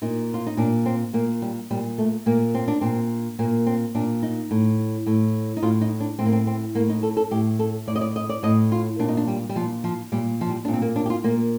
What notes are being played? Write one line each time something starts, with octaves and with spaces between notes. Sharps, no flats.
A#2 D#4
F4
D#4
A#2 D4
C4
A#2 A#3
G3
A#2 G3
A3
A#2 A#3
C4
D4
A#2 C4
A#2 A#3
C4
A#2 D4
D#4
A2
A2
D#4
A2 F4
D#4
D4
A2 C4
A#3
C4
C4
A2 A#3
D#4
A4
A4
A2 G4
A4
A2 D5
D#5
D5
D#5
D5
A2 D#5
F4
A#2 D4
D#4
D4
G3
G3
A#2 F3
F3
A#2 G3
F3
G3
A#2 D4
C4
A#3
D4
G4
F4
A#2 A#3